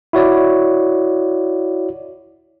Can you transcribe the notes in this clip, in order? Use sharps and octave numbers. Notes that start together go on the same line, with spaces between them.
E4 F#4 C#5 D5